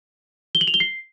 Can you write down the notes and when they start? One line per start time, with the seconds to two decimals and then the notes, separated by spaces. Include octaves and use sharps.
0.55 G7
0.61 F#7
0.67 F7
0.74 G7
0.80 C7